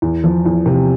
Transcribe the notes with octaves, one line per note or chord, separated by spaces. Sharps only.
E2
F3
E2
C3